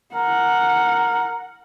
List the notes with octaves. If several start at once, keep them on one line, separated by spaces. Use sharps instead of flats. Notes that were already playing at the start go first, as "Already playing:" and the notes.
A#4 F#5